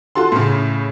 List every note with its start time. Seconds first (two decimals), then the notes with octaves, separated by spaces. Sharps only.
0.15 F4 F#4 A4 C6
0.32 A2 C#3